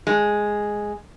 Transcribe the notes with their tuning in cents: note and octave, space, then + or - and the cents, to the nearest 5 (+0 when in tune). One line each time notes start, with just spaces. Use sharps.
G#3 +0